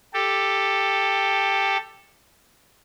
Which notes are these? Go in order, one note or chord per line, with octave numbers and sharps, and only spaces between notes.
G4 A4